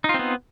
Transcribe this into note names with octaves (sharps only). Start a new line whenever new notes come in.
B3 C4 D#4 F4